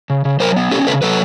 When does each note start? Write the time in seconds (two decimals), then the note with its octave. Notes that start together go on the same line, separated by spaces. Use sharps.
0.10 C#3
0.25 C#3
0.40 F#3 A#4 C5
0.56 B3
0.71 C#4 G4 A4
0.87 C#3 A4 B4
1.02 F#3 A4 B4